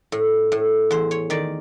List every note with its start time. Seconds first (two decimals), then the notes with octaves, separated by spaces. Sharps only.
0.12 A2
0.52 A2
0.91 E2 C5
1.11 C#5
1.30 D#3 D5